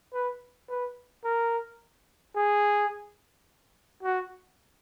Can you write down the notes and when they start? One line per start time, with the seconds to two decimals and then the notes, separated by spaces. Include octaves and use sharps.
0.13 B4
0.69 B4
1.24 A#4
2.36 G#4
4.03 F#4